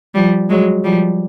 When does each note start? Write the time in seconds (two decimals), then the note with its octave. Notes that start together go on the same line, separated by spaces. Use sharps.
0.15 F3 G3
0.49 F#3 G#3
0.84 F3 G3